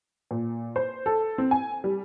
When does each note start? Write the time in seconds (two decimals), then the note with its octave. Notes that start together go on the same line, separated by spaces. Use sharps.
0.31 A#2
0.76 C5
1.06 A4
1.38 C4
1.51 G#5
1.84 G3